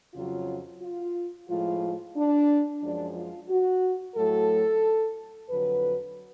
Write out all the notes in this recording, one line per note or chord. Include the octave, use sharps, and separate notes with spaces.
F2 C#3 F#3 F4
F4
A2 F3 G#3 F4
D4
F#2 F3 G#3 D4
F4
F#4
A2 F#3 A3 A4
F2 D3 F#3 B4